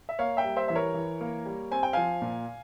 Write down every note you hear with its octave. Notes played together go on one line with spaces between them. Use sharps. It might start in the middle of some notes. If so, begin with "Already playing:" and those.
E5
A#3 C#5 F5
E5 G5
G3
C5 E5
E3 E5
A#4 C#5
E3
A#3
G3
C4 G#5
G5
F3 F5 G#5
A#2